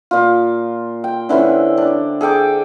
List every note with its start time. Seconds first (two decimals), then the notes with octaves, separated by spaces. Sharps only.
0.11 A#2 F4
1.04 G5
1.29 D3 E3 C4 C#4
1.78 D4
2.21 G#4 A4 G5 D6